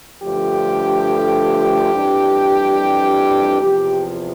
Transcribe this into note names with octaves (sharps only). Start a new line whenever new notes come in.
G2 D3 F3 A3 G4
F2 E3 G3 D4
E2 C3 F3 G4